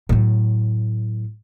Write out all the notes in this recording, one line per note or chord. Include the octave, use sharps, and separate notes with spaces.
A2 F#3